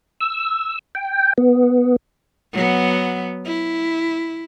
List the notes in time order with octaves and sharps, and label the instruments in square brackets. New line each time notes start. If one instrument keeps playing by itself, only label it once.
[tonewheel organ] E6
G5
B3
[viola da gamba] F#3 B3
E4